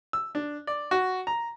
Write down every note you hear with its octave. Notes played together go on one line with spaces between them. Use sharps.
E6
D4
D5
F#4
A#5